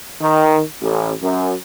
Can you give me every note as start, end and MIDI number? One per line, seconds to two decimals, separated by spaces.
0.20 0.60 51
0.81 1.10 33
1.22 1.51 42